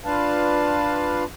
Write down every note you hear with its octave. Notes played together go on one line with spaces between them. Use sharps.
D4 F4 B4 F5 A5